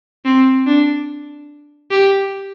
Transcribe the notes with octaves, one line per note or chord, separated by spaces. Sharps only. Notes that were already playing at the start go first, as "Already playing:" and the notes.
C4
D4
G4